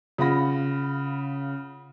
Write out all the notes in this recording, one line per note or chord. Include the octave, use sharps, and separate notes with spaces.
C#3 F4 F#5 B5 A#6